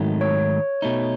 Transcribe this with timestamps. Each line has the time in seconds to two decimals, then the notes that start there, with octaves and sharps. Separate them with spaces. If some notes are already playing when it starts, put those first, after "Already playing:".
Already playing: G#2 D#3 F#3 A3
0.21 C#5
0.82 B2 A3 D#4